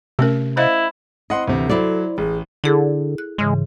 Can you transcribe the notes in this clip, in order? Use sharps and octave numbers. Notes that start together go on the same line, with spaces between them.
C3 A3 C#4 A#4
E4 C5 D#5 F5
C4 E4 D#5 F#5 C6
D2 C3 E3
F#3 E4 A4 C5 D5
A1 G#4
D3 E4 G#4 A4
F#6
G#2 C#3 E3 G#3